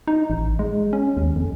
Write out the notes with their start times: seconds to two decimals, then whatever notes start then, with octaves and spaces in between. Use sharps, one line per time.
0.07 D#4
0.30 A1
0.59 G#3
0.93 C#4
1.17 D#2
1.36 F2